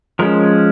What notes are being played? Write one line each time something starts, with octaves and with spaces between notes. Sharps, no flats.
F3 G#3 C#4 A#4